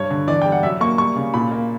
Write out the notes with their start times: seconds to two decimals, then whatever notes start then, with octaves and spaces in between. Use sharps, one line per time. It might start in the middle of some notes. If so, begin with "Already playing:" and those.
Already playing: G2 C#5
0.10 D3
0.27 E3 D5
0.42 G3 G5
0.52 F#5
0.63 F#2 E5
0.80 A#3 C#6
0.98 G3 C#6
1.16 C#3
1.34 A#2 B5
1.52 A#3